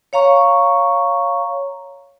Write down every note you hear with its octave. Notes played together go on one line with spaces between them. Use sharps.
C#5 F5 A#5 C#6